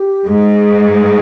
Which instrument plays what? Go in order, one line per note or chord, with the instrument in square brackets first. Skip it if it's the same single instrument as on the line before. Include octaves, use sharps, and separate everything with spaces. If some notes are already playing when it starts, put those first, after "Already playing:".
Already playing: [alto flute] G4
[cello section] G#2 [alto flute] G#4